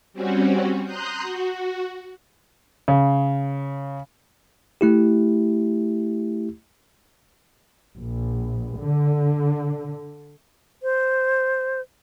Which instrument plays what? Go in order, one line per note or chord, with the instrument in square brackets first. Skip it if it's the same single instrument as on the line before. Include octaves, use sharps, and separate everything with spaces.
[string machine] G3 C4 C#4 F#4
A#5 C6 D#6 F#6 G6
F#4
[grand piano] C#3
[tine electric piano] A3 E4 G4
[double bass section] A#1
D3
[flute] C5